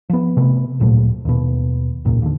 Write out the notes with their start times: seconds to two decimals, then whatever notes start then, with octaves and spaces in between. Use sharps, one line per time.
0.10 F3 B3
0.37 C3 A3 B3
0.80 D1 A#2 F#3 A3
1.25 D#2 B2
2.05 E1 C#2 A#2
2.22 D#2 D3